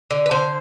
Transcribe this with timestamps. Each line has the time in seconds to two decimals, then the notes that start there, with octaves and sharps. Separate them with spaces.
0.11 D3
0.26 B4
0.31 D3 C5